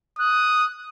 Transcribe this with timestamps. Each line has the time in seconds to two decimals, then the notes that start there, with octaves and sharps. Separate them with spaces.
0.19 D#6 F#6